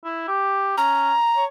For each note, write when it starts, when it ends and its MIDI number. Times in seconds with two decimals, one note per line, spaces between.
0.04 0.23 64
0.28 0.73 67
0.77 1.13 61
0.77 1.44 82
1.36 1.47 73